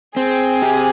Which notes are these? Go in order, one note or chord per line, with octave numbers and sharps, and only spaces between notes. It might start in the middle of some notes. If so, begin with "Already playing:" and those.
C4 G#4
G4